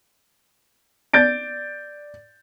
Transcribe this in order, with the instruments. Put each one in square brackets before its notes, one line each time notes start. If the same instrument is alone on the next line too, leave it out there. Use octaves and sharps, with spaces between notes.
[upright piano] D5 G6 A6 D7